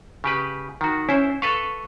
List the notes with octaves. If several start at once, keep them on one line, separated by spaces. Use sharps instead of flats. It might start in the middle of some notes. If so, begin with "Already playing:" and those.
C#3 G4 B4
D#3 F#4
C#4 E4 C5
A4 B4 F5 C#6